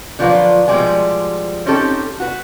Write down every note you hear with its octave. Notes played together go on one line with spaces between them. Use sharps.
D3 F3 F#3 F4 B4 D5
B2 F3 G3 G#3 D5 G#5
C4 C#4 D#4 G4 A4
F#4 B4